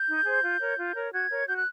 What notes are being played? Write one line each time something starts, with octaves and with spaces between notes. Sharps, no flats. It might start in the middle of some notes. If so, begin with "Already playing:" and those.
Already playing: G6
D#4
G#4 C5
F4
A#4 C#5
F4
A#4 C#5
F#4 G#6
A#4 C#5
F#4 G6
F#6